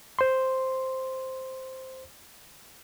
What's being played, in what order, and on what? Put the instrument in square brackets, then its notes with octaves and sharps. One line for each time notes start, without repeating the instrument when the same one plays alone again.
[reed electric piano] C5 C6